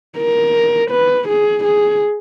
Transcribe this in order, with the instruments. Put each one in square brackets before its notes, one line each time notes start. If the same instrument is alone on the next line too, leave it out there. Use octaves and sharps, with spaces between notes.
[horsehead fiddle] A#4
B4
G#4
G#4